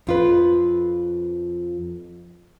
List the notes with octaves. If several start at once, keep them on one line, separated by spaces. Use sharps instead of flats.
F2 F4 B4